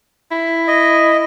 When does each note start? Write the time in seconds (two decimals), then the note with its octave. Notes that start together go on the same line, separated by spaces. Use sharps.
0.31 E4
0.68 D#5